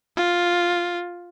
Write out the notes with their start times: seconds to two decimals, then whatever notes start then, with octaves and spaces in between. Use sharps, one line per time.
0.17 F4